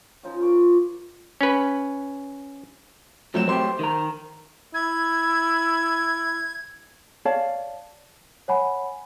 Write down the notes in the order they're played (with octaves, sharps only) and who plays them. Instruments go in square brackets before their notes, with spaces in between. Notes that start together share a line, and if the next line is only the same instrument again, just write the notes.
[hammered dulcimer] C#3 F3 D#4
F4 A#4 C#6 D6
[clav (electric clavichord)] C#4 B4
[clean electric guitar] F2 A3 [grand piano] F#3 C4 E7
[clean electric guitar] F#3 A3 G4 [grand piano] C5 C6
[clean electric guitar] D#3 A#5
[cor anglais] E4 [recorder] G#6
[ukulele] C#5 D5 F5 A5
[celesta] C#5 F#5 G#5 B5